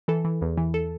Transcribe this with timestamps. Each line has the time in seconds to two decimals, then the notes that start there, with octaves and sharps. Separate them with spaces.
0.08 E3 A4
0.25 E3
0.41 E2
0.58 E3
0.74 A4